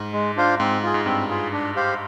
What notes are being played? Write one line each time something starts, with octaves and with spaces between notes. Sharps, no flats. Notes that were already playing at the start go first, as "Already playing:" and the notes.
Already playing: G#2
G#3
D4 F4 C5 F5
G#2 C4
F4 G#4
G#2
G2 C4
F4 G#4
D4
G4 C5 F5